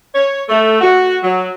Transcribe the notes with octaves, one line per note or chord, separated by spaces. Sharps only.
C#5
A3
F#4
F#3